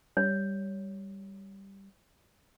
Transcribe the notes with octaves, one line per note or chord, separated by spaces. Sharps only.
G3 C#5